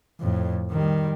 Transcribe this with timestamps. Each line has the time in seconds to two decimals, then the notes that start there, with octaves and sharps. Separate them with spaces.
0.20 F2 A2
0.70 D#3 G3